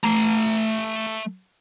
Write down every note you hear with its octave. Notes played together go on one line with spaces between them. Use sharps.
A3 A#5